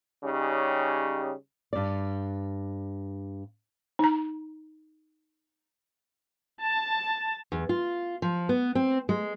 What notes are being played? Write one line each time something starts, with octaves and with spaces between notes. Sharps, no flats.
C#3 G3 C#4 D#4 G4
G2 D5
D#4 A#5
A5
E2
F4
F3
B3
C4
G#3